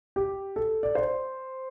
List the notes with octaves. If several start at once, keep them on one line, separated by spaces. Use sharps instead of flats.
G4
A4
D5
C5